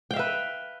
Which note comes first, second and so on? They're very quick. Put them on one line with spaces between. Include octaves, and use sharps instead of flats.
G5 F5 E5 B4